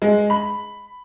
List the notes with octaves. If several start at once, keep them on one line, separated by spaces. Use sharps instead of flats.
G#3
B5